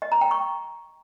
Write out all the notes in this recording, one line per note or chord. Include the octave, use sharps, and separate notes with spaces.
D#5
A#5
G5
C#6